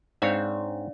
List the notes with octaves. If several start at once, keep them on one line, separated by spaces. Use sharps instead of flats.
G#2 C4 D4 C#5 D5 F5